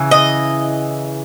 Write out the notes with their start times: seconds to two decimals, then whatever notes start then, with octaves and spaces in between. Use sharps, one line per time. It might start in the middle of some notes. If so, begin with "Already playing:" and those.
Already playing: C#3 E3
0.11 D#5